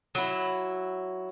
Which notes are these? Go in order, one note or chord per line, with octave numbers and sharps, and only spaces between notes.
F#3 E4